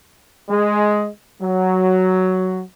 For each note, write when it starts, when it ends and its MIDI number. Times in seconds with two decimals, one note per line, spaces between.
0.49 1.07 56
1.41 2.62 54